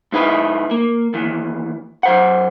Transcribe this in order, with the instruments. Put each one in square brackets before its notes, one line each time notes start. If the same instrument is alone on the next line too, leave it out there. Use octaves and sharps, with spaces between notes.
[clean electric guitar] G#2 D#4 E4 B4
A#3
D#2 E3
F#2 C5 F#5